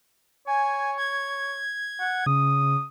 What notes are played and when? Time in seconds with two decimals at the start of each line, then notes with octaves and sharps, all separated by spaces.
0.47 C#5 G#5
0.98 G#6
2.00 F#5
2.26 C#3 D#6